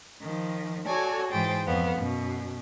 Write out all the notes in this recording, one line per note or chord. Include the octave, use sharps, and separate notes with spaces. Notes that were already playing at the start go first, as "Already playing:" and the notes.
D#3 F3
F#4 A4 C#5 D5 G#5 A5
G#2 E3 G#4 C5 G5 A6
F2 B3 F5
F#2 B2